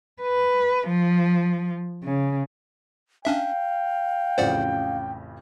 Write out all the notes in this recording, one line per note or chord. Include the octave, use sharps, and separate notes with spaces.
B4
F3
C#3
C#4 D4 E5 F5 G5
A1 F2 C#3 C5 D5 F#5